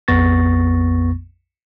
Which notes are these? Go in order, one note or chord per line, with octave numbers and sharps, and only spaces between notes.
A#1 F2 B3 C#6 A6 A#6